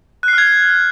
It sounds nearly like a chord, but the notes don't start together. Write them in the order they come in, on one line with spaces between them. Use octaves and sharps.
F#6 C7 F6 G#6